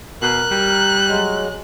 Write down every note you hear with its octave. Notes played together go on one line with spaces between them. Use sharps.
B2 A#4 F#6
G3
F#3 G#3